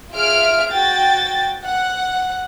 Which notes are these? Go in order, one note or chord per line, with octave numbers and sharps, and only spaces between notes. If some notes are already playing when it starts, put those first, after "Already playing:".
F4 G#4 E5 F6 D7
F#4 G5 A6
F#5